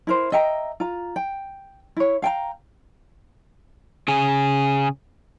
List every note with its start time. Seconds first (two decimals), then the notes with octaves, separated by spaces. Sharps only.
0.07 E4 A#4 C5
0.32 D#5 E5 G5 A#5
0.80 F4 A#5
1.16 G5
1.97 E4 C#5
2.22 F5 G5 G#5 A#5
4.08 C#3 G#4